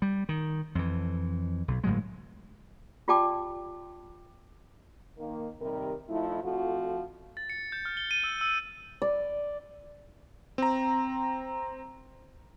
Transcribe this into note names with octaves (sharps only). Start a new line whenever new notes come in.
G3
D#3
F2 E3
B1
G1 A2 F#3 G#3
F4 G4 D5 G5 A5 D6
D#3 A#3
C3 D#3 G3 A#4
F3 A3 D#4 E4
F2 F3 A3 F#4
A6
C#7
G6
F6
G7
D#7
E6
E6
D5
C4 A#5